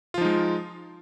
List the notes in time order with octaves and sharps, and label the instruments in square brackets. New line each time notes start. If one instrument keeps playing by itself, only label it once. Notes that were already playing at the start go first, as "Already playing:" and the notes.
[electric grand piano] F4
F3
D#4
G#3